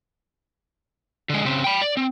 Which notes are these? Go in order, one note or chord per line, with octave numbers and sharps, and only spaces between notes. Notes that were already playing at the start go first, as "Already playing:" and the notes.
D3 G#3
C#3 C4
G5 B5
D5
C4